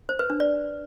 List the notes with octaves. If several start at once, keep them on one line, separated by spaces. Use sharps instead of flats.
C5
B4
D4
D5